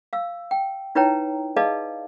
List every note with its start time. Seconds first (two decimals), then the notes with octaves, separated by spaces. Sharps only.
0.13 F5 E6
0.51 G5
0.95 D#4 E4 B4 C#5 G5 A#5
1.56 G#4 B4 D5 D#5 F5 A5